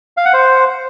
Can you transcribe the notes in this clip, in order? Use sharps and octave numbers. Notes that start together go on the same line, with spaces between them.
F5
F#5
C5